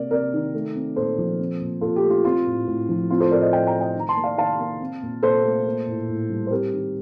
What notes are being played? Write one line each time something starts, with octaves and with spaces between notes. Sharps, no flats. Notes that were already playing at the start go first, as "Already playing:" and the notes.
Already playing: C3 A#3 A#4 D5
C3 A#4 D5
D#3
A3
C4
A#2 A4 C5
F3
C4
A#2
A#2 F4 A4
G4
A3
F4
C4 F4
A2
A2
F3
C4 F4
A4 C5
A2 A#4 D5
C5 D#5
A2 D#5 G5
G5 A#5
A3
D#5 G5
D#3 A#5
A5 C6
A#3
D5 F5
D#3 F5 A5
A#3
C4
A#2
A#2 A4 C5
A3
A#3
A2
A2
G3
C5
C4 G4 A#4
D#3